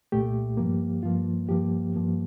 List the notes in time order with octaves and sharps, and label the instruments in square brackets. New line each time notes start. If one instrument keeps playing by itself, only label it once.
[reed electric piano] C2 A#2 A3 G4
G2 F3 A#3
G2 F3 A#3 F4
G2 F3 A#3 G4
G2 F3 A#3